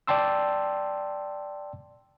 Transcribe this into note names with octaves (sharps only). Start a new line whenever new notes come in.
D5 G5 A5 C6 E6